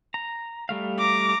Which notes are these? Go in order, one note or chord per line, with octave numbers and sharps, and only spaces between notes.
A#5
G3 A3 F5
A#5 D6